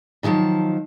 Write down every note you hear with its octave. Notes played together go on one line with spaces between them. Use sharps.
A#2 D#3 F3 F#3 A5